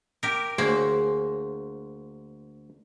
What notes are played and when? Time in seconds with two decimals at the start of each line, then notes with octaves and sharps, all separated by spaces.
0.23 G4 A#4
0.58 D2 A#3 G#4 C5 C#5